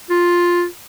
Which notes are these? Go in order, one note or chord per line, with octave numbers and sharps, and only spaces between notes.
F4